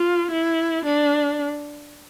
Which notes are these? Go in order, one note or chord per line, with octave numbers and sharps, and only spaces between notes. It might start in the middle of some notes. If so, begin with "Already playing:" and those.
Already playing: F4
E4
D4